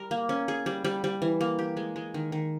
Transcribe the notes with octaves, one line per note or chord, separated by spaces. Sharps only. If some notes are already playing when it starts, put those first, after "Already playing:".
Already playing: G3 A#4
A#3
C#4
G#4
G3
G3
G3
E3
A#3
G4
G#3
G#3
D#3
D#3